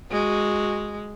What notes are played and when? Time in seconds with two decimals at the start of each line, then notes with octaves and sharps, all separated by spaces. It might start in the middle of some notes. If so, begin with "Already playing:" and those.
0.11 G#3 F#4